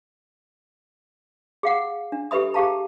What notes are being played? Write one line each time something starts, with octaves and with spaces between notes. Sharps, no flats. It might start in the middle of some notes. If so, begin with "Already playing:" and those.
G#4 F5 F#5
D4
G4 A4 B4 E5 B5 D#6
G4 G#4 F5 A5 A#5